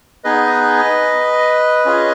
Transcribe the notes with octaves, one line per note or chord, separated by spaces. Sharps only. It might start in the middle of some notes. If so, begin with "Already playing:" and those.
B3 D#4 G#4 B4 D#5
C#4 F4 G#4